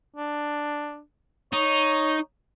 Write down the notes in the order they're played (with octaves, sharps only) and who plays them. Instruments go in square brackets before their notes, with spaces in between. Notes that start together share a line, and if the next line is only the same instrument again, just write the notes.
[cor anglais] D4
[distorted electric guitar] D#4 [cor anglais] C#5